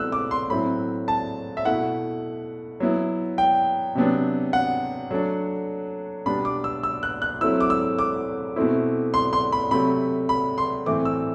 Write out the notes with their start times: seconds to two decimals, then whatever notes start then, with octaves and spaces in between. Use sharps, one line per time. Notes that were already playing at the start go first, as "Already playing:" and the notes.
Already playing: B2 A3 C4 E4 E6 F#6
0.12 D6
0.31 C6
0.50 A2 F#3 C4 E4 B5
1.08 A5
1.57 E5
1.65 B2 A3 E4 F#5
2.80 F#3 B3 E4
3.38 G5
3.95 C3 F#3 B3 D4
4.53 F#5
5.11 F#3 A3 D4
6.26 B2 G3 B3 D4 B5
6.45 D6
6.64 E6
6.83 E6
7.03 F#6
7.22 F#6
7.41 F#3 A3 C4 E4 E6
7.60 D6
7.70 E6
7.99 D6
8.56 B2 A3 C4 E4
9.14 C6
9.33 C6
9.52 B5
9.71 C3 F#3 A3 B5
10.29 B5
10.58 C6
10.86 A2 E3 A3 C4 D6
11.05 E6